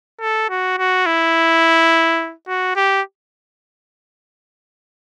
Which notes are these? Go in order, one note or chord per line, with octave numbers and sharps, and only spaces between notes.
A4
F#4
F#4
E4
F#4
G4